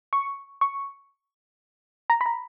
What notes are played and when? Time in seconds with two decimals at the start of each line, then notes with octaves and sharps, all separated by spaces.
0.13 C#6
0.61 C#6
2.10 A#5
2.21 B5
2.26 A#5